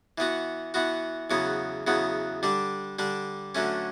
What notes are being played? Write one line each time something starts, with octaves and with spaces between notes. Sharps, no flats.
E3 B3 F#4
E3 B3 F#4
E2 C#3 F#3 B3
E2 C#3 F#3 B3
D3 G3 D4
D3 G3 D4
D3 F#3 A3 C#4